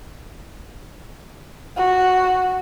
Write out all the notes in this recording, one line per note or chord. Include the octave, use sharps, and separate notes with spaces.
F#4